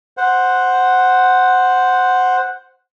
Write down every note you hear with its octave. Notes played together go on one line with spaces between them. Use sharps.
C5 F#5